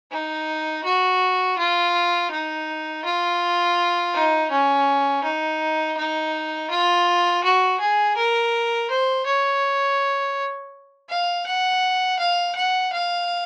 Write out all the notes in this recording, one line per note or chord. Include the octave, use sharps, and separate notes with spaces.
D#4
F#4
F4
D#4
F4
D#4
C#4
D#4
D#4
F4
F#4
G#4
A#4
C5
C#5
F5
F#5
F5
F#5
F5